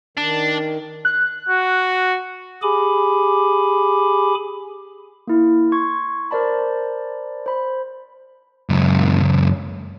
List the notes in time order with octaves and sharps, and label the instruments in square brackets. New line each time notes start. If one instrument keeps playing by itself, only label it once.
[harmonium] D#3 [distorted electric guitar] D4
[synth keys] F#6
[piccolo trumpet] F#4
[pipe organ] G4 G#4 G#5 B5 D6
[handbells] A#3 E4
C6 C#6 G#6
A#4 C5 D5 A5 B5
C5 B5
[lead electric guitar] C#2 F#2